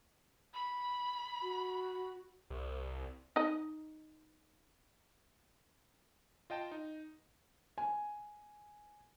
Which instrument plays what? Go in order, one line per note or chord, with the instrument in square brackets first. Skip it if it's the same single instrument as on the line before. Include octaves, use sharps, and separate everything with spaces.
[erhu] B5
[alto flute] F#4
[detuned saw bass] C2
[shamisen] D#4 D#5
[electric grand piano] F4 D#5 G5 A5
D#4
[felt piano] G#5